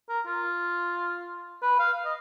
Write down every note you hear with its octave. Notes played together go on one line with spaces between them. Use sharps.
A#4
F4
B4
F5
D#5